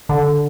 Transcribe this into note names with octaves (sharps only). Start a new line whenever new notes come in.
D3